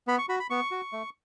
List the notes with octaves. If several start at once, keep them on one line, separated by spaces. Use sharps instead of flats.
B3 B5
C#6
F#4 B5
B5
B3 C#6
F#4
A3